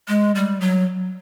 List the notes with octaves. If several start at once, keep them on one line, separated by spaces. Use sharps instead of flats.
G#3
G3
F#3